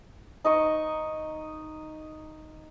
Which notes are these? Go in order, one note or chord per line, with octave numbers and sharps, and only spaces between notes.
D#4 D#5 C#6